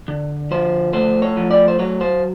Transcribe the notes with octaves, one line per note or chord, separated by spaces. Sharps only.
D3
F3 C5
A3 C5
C#5
F3
D5
C5
F#3 C#5
C5